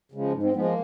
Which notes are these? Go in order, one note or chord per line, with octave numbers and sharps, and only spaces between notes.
C#3 F3 G#3
G#2
C4
F3 G#3 B3
A#3